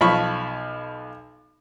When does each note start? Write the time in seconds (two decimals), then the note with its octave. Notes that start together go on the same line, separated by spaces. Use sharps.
0.01 B1 F3 B5 C#6